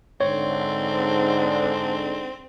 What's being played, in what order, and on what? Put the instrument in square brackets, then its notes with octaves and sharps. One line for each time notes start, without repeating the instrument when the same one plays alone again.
[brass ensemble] G#2 D3 [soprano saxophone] C4 [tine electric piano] C#5